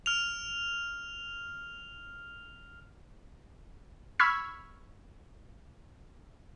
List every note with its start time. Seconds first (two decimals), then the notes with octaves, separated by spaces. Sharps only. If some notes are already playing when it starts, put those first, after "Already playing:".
0.06 F6 F7
4.19 B5 C#6 E6 F6 G#6 B6